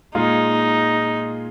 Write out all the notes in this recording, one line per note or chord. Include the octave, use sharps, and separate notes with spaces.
A#2 G#3 D#4 F4 G#4